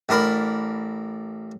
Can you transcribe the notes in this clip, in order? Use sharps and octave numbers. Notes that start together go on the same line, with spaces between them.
A1 D4 A#4 B5